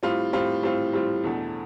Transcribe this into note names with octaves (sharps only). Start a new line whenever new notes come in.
A2 G3 C4 F4
A2 G3 C4 F4
A2 G3 C4 F4
A2 G3 C4 F4
E2 B2 A3 D4